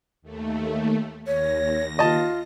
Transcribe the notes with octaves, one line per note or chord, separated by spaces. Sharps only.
D#2 A3
D#2 C#5 A#6
F4 D#5 A5